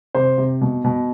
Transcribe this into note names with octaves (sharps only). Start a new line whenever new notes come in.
C3 C5
C3
B2
B2